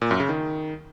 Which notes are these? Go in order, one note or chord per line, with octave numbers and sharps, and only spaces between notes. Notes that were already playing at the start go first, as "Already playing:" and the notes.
A#2
F#2
C#3
D#3